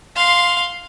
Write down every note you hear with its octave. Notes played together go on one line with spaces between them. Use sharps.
F5 C6